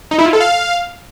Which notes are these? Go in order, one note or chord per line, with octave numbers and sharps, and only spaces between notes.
D#4
E4
F4
A4
F5